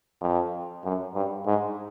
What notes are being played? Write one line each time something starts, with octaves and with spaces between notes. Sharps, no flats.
F2
F#2
G2
G#2